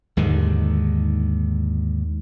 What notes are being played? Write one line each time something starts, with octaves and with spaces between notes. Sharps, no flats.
D#2 G#2 D3 D#3